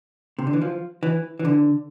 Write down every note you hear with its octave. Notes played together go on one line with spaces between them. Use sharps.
C3
D3
E3
F3
E3
E3
D3